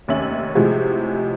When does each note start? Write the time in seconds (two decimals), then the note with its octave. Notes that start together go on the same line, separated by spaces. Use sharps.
0.08 F1 D#2 C#4 E5 F#7
0.55 A2 C3 F3 G#3 F#4